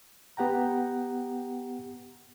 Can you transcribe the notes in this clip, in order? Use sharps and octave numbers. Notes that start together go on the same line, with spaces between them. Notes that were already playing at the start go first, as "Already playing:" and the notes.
B3 G4 F#5 G5 A#5